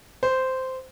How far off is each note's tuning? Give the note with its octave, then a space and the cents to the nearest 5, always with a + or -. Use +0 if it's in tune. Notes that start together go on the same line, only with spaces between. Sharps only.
C5 -10